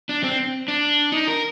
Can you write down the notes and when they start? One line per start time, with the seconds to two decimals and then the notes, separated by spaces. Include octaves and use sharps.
0.09 D4
0.24 C4
0.68 D4
1.12 D#4
1.28 A#4